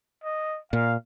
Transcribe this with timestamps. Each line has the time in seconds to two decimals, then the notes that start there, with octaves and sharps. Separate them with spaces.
0.24 D#5
0.73 A#2 F5